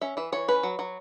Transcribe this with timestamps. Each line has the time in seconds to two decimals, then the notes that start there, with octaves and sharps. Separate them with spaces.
0.01 C#4 E5
0.17 E3 E5
0.32 E3 C#5
0.48 C#4 B4
0.63 F#3
0.79 F#3